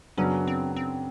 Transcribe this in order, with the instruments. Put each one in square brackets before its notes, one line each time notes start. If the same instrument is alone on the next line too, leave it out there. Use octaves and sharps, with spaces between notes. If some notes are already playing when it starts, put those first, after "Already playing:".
[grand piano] F#2 C#3 F#3 B3 D4 [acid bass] C#4
[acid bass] C4
C4